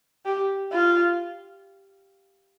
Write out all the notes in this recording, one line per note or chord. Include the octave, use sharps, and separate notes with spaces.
G4
F4